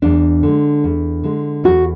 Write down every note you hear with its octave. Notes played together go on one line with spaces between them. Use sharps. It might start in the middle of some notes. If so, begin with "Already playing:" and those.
E2 D4
D3 G#3
E2
D3 G#3
E2 F#4